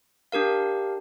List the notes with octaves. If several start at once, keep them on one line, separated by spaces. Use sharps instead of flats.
D4 G4 A#4 F5